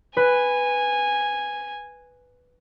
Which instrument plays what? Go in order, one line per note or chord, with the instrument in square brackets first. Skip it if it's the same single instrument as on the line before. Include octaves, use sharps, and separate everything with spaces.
[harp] B4 [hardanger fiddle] G#5